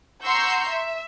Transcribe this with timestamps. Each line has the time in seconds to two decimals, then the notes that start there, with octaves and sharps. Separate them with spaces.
0.24 F#5 A#5 C6 C#6 E6 G6
0.68 E5